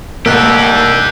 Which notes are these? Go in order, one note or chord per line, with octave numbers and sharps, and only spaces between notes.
F1 C2 A#3 D4 D#4 G4 E6 F#6